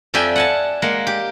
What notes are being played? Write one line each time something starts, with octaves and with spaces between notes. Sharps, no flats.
F2 F3 D5 E5 G5 G#5
F#5 G#5 A5
G#3 A#3 F#5
G4